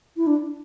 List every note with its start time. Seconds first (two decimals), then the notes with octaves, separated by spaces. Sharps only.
0.17 E4
0.27 D4